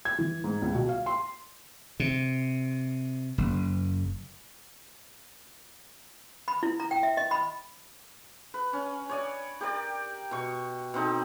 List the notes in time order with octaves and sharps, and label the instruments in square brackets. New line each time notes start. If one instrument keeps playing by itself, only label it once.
[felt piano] G#6
E3
G#2
C#2
B2
F5
C6
[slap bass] C3
F#1
[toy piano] B5
E4
A#5
G5
E5
D#5
B5
[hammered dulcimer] B4
C#4
C#5 D5 G#5
G4 A#4 D5
B2 C#6
B2 C4 D#4 A4